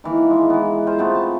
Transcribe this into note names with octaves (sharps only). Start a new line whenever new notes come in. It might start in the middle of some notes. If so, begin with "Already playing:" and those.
D#3 E3 A#3
G#3
E3 B3
F4 C5 A#5
A3 B3 C4
A5